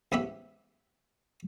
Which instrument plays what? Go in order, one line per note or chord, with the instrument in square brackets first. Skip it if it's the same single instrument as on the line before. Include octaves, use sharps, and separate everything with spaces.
[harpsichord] A1 G#2 B3 G4 E5 B5